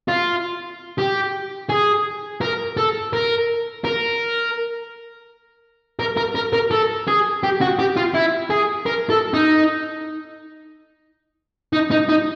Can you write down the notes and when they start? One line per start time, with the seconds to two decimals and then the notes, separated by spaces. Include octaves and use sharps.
0.08 F4
0.98 G4
1.69 G#4
2.41 A#4
2.77 A4
3.13 A#4
3.85 A#4
6.00 A#4
6.17 A#4
6.35 A#4
6.53 A#4
6.71 A4
7.07 G#4
7.43 G4
7.61 F#4
7.79 G4
7.97 F4
8.14 E4
8.50 G#4
8.86 A#4
9.10 A4
9.34 D#4
11.73 D#4
11.91 D#4
12.09 D#4